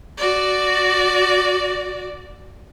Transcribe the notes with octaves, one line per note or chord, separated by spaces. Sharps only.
F#4 D5